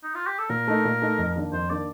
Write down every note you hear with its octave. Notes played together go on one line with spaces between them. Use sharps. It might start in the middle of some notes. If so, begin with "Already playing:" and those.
D#4
F4
G4
A4
A#2 A#4
A3 D#4
A#2
A3 D#4
F2
D#3 A#3 D4
F2 C5
D#3 A#3 D4 D5